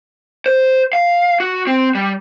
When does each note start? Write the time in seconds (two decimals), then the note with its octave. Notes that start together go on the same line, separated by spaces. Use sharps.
0.46 C5
0.93 F5
1.40 F#4
1.67 C4
1.95 G3